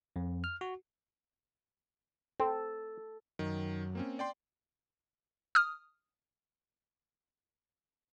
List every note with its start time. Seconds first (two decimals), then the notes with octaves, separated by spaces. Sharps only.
0.16 F2
0.44 F6
0.61 F#4
2.40 C4 A4
3.39 F#2 D#3
3.95 A#3 C4 C#4
4.19 D5 G5 C6
5.55 D#6 F6